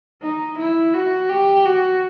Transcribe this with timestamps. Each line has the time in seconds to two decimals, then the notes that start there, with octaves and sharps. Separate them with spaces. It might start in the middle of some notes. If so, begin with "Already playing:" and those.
0.22 D#4
0.58 E4
0.94 F#4
1.30 G4
1.65 F#4